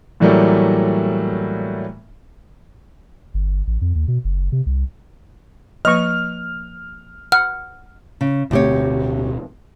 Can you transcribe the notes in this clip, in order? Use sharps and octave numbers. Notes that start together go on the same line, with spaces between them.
A2 E3 F#3 G3 A3 A#3
G1
A1
F2
D#2
B2
F#1
C3
C2
F3 A#3 B4 D#5 C#6 F6
F#5 F6
C#3
D1 D2 B2 C4 G4 C#5